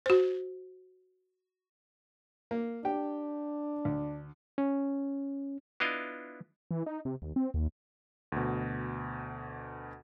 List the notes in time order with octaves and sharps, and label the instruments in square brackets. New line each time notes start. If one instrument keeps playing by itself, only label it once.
[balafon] F#4 C5
[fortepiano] A#3
[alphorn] D4 [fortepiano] G4 G5
[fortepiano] D2
[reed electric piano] C#4
[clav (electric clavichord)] B3 D4 E4 F4 D#5 F5
[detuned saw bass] E3
D#4
C3
D#2
C4
D#2
[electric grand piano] D2 B2